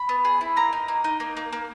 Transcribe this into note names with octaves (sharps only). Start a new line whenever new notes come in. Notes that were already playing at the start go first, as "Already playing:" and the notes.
Already playing: B5
B3
G#4
E4
A#3 A#5
D#4
A#3
D#4
A#3
A#3
A#3